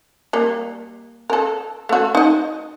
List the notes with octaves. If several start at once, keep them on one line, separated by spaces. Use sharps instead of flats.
G3 A#3
A4 A#4
A3 F#4
D#4 D#5